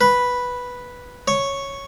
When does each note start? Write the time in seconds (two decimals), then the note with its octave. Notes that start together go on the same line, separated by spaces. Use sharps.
0.01 B4
1.28 C#5